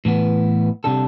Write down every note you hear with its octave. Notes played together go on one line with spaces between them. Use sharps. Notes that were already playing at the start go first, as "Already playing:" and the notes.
A2 E3 B3
C3 G3 D4 A4